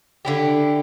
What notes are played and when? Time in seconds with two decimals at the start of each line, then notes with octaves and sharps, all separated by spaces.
0.25 D3 E4 G4